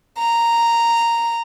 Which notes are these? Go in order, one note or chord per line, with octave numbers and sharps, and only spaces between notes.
A#5